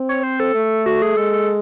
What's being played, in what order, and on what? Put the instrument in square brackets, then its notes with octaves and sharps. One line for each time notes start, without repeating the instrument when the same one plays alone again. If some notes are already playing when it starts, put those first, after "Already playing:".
Already playing: [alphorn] C4
[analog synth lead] C#5
C5
A4
[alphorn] A3
[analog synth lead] F#4
G#4
[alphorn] G#3 [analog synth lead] A4
[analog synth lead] A4